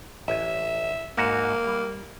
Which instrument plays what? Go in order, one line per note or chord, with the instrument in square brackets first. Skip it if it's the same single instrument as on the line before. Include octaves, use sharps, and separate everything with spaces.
[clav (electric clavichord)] A1 G#5 [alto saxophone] E5
[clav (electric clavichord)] G#2 F#4 [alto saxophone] A#3
[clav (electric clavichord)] G3